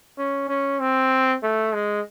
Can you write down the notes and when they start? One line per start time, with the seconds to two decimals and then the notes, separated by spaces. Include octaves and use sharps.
0.18 C#4
0.49 C#4
0.80 C4
1.43 A3
1.73 G#3